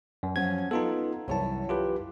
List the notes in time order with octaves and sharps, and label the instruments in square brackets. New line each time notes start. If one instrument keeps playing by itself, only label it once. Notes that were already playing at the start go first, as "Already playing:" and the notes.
[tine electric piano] F#2
[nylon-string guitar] F3 F#3 C#4 [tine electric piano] G#6
[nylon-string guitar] B3 F#5 [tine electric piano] D#4 F4 A4
[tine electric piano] C2 A5 [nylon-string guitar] F#2 E3 C#5
[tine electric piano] F4 G4 B4